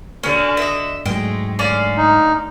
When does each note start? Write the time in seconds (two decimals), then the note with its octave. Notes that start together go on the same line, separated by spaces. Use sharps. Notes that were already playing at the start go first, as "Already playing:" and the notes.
0.24 D3 C#4 F#4
0.57 D#5 E5
1.06 G#2 F#3 G#3 A3 G5
1.59 D3 A3 C#4 D5 F5
1.97 D#4